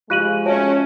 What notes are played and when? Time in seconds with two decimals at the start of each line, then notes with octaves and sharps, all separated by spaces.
0.10 F3 G#3 F4 G4 F5 F#6 D#7 F#7
0.46 C#4 F#4 C#5 E5 G#5 A5